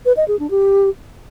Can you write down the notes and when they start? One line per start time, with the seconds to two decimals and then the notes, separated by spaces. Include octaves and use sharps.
0.06 B4
0.17 D#5
0.28 G#4
0.39 D4
0.51 G4